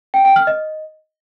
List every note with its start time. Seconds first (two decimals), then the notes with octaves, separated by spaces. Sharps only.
0.14 G5
0.25 G5
0.36 F6
0.47 D#5